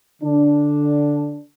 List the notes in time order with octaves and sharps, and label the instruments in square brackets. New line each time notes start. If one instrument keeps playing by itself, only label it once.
[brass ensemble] D3 D4